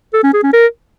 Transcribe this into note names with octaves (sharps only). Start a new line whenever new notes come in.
A4
C#4
G#4
C#4
A#4